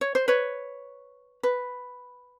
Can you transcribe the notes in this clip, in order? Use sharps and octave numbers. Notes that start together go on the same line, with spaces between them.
C#5
C5
B4 C#5
B4